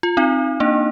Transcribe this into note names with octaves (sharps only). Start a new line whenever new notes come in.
F4
C4 D#4
A#3 D4